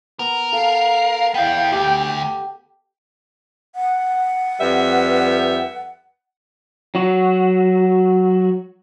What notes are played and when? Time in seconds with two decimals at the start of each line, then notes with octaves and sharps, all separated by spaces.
0.19 B3 A#4
0.53 A4 F5
1.34 B3 E4 G5
1.72 D2 G4
3.75 F#5
4.60 F2 G3 B4 E5
6.95 F#3 F#4